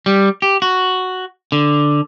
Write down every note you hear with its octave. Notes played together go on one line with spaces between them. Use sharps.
G3
G4
F#4
D3